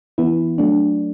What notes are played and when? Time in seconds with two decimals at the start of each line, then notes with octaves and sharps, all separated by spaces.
0.18 E3 B3 E4
0.58 F#3 A3 D4